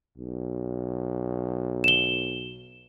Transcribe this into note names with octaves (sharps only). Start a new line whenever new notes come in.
B1
E7 G7